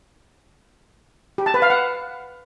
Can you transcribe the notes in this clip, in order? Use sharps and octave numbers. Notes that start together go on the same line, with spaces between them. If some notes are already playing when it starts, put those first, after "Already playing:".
G4
A5
B4
F5
F#5